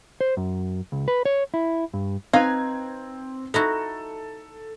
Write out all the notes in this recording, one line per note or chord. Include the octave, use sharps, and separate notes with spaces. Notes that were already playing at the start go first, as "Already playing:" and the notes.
C5
F#2
C#2
B4
C#5
E4
G2
C4 D#4 B4 F5 G#6
D#4 E4 F#4 A4